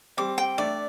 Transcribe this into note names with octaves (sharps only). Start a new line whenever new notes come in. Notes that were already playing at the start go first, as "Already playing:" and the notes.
G3 C4 D6
G5
A3 D4 D5